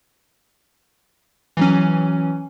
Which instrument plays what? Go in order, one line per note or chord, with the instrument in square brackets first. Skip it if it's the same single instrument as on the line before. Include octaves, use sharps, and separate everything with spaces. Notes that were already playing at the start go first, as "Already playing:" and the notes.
[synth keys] E3 F#3 C#4